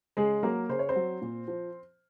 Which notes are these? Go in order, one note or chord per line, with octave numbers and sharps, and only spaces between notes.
C#3 G#3 G#4
F#3 A#3 A#4
C#3 C5
C#5
C4 C5
F#3
A#2
F3